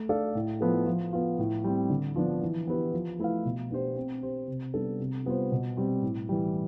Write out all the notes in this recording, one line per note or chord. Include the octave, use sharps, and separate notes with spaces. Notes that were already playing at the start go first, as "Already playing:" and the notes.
Already playing: A3
D4 A4 D5 F5
A2
F3 B3 E4 A4
F3
B3 F4
A2
G3 C4
D3
F3 B3 D4
E3
B3 E4 G4 B4
F3
A3 E4 B4 F5
B2
B3 D4 G4 C5
C4
G4 C5
C3
G3 B3 D4 A4
C3
G3 B3 F4 C5
B2
G3 C4
A2
E3 G3